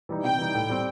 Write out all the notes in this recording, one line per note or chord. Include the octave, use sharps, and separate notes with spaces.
E3 G3 D#4
C3 G5
E3 G3 D#4
A2
G3 C4